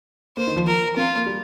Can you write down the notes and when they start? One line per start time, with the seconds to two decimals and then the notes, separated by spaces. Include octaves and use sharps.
0.37 A#3 C5
0.47 D#3
0.56 F3
0.67 F3 A#4
0.96 C4 F4
1.16 A#3
1.26 G3